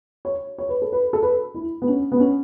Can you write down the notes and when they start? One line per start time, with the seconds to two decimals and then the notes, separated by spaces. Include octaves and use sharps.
0.25 C#5
0.58 C#5
0.69 B4
0.82 A4
0.93 B4
1.13 A4
1.23 B4
1.55 E4
1.82 B3
1.88 C#4
2.12 B3
2.20 C#4